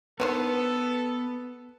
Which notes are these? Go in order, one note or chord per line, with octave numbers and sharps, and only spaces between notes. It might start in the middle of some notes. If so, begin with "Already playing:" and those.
D3 D#3 B3 A4 B4 C5